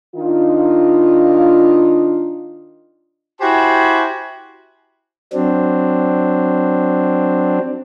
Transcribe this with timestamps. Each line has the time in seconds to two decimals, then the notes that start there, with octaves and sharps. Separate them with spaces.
0.16 D#3 D4 D#4 F4
3.41 E4 F#4 G4 C5 G#5
5.33 F#3 C4 D4